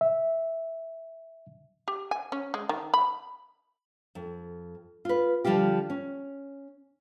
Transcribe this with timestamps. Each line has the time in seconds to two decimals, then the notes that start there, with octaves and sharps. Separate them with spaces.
0.01 E5
1.88 G4
2.11 G#5
2.32 C#4
2.54 G#3
2.69 D#3
2.94 B5
4.15 F2
5.05 F4 B4
5.45 D3 F3 G3 F4 G4
5.90 C#4